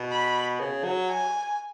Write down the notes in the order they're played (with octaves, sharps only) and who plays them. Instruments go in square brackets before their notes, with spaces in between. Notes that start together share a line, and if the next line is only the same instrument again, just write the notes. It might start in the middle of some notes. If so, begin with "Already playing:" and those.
Already playing: [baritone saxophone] B2
[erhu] B5
[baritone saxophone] C#3
F#3
[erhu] G#5